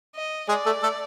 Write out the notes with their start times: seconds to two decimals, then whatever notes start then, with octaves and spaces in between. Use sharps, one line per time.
0.15 D#5
0.49 G#3 G#4 D5
0.66 A3 A4
0.83 A3 A4